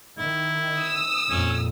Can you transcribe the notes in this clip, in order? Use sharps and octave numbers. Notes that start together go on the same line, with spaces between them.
D#3 E4
D#6 E6
F2 A#2 C#4